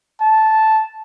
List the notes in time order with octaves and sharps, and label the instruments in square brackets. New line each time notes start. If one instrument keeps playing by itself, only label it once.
[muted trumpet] A5